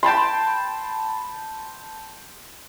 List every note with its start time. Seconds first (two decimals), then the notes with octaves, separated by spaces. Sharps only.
0.03 G5 A5 B5 C6